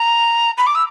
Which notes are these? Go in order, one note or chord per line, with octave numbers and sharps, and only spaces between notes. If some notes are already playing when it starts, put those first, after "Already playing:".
Already playing: A#5
B5
D6
E6